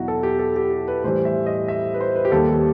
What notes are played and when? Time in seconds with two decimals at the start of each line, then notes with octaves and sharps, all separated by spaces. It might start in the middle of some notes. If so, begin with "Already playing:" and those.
Already playing: E2 B2 F#3 E4 F#4
0.08 A4
0.23 G4
0.39 A4
0.56 G4
0.88 B4
1.04 A2 E3 G3 C5
1.25 E5
1.46 D#5
1.68 E5
1.94 B4
2.00 C5
2.16 B4
2.25 G4
2.32 D#2 D#3 G3 A4